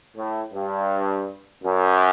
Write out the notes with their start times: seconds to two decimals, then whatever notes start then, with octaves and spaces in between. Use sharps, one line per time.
0.16 A2
0.53 G2
1.64 F#2